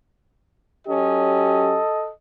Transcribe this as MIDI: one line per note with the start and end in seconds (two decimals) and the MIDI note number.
0.88 1.78 54
0.88 1.78 61
0.88 1.78 67
0.88 2.11 69
0.88 2.11 75